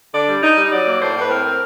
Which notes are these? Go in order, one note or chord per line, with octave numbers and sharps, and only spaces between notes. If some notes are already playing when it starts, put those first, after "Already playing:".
D3 D5
G3
D#4
G3
F#3 D5
A#3
A2 C5
A2 B4
C4 A#4
C4